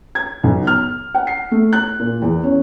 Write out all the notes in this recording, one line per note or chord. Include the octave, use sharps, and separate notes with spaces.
G#6
B1
F6
F#5
C7
A3
F#6
A#2
E2
C#4